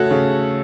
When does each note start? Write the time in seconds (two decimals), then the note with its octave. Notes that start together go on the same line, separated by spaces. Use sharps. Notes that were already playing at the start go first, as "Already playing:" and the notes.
Already playing: C#3 A3 F#4 A4 C#5
0.11 C#3